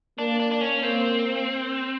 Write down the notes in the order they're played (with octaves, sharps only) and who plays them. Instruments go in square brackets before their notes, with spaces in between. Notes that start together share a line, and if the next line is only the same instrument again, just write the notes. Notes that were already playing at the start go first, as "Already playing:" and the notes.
[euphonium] A#3 [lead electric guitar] D4
[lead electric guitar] D4
D4
C#4
[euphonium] A#3 [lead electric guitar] C4